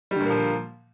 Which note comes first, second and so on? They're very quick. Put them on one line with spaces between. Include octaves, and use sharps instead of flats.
G3 D3 A#2 A#3 F3